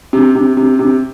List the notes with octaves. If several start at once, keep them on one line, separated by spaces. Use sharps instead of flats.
C3
C3
C3
C3